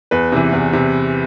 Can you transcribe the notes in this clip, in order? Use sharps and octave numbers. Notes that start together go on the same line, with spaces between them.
E2 B4
C3 E3
E2
C3